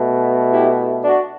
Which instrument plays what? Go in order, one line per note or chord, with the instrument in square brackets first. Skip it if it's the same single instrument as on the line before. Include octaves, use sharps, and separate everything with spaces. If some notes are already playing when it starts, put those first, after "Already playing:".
Already playing: [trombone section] B2 A3
E4 G4
D4 F#4